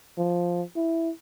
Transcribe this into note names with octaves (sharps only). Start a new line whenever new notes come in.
F3
E4